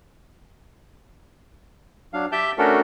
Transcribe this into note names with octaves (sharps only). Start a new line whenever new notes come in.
F#3 D4 F5
G4 E5 G5 A5 G6
A3 C#4 D4 F#4 A4 A#4